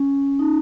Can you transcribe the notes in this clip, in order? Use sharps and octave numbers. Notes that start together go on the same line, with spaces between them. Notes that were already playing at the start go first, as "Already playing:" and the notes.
Already playing: C#4
D#4